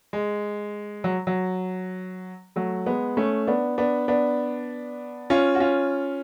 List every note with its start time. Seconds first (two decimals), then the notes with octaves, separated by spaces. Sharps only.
0.13 G#3
1.04 F#3
1.27 F#3
2.56 F#3 A3
2.86 G#3 B3
3.17 A3 C#4
3.47 B3 D4
3.78 B3 D4
4.08 B3 D4
5.30 C#4 F4
5.55 F#4
5.60 C#4 F4